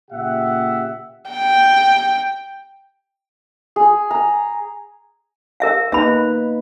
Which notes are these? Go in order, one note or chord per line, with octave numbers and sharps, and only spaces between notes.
A#2 C#3 G4 E5 F#5
G5
G#4
A#5
A#4 E5 F5
A#3 D#4 B4 E5 B5